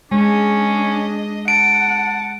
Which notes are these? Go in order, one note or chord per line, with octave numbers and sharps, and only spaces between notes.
G#3 C#4 D4 D#5
F#5 A5 D7